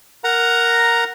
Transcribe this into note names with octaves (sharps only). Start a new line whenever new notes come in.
A#4 F#5 A#5